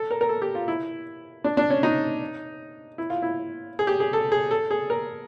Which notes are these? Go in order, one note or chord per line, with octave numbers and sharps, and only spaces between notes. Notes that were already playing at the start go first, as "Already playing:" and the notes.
Already playing: A4
A#4
A#4
A4
G4
F4
E4
D4
D4
C#4
D#4
E4
F4
E4
G#4
G4
G#4
A4
G#4
A4
G#4
A#4